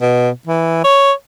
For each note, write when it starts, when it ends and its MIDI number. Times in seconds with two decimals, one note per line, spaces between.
0.01 0.29 47
0.47 0.80 52
0.84 1.12 73